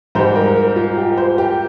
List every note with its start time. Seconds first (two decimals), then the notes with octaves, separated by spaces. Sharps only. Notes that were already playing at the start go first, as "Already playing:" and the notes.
0.15 G#2 G3 C5
0.35 A#4
0.56 A#4
0.76 F4
0.97 G4
1.17 C5
1.38 G4